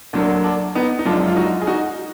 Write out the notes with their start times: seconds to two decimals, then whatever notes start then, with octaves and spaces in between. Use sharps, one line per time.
0.13 D2 D3 F#3 A#3 D4
0.44 D4
0.75 B3 D#4
0.99 D#4
1.06 F#2 F3 G#3 D4 F4
1.28 F4
1.36 D#4 F#4
1.62 G#4
1.67 D#4 F#4